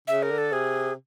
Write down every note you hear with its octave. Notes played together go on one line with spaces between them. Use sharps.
C#3 E5
A#4
D3
A4
C3 G#4